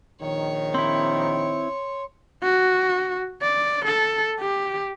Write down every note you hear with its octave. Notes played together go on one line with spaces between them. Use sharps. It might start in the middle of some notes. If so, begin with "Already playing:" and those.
A#1 D#3 C#5
C4 E4 C6
F#4
D5
A4
G4